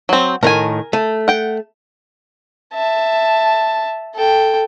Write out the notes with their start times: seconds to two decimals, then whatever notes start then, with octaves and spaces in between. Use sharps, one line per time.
0.09 F#3 C4
0.43 A2 D#3 A#4 G#5
0.93 A3
1.28 F#5 G5
2.74 E5 A5
4.14 A4 G5